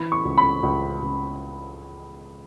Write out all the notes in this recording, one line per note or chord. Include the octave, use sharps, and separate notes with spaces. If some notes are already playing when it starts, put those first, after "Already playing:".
Already playing: E3 B5
C#6
C#2
B5
C#2
C#2